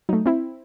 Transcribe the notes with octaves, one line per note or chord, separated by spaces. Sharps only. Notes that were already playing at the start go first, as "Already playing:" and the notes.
F#3 A3 D#4
C4 E4